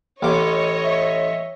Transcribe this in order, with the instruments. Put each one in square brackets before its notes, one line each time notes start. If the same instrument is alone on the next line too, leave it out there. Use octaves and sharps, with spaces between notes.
[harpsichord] A1 D6 [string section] C#5 D#5
[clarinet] E5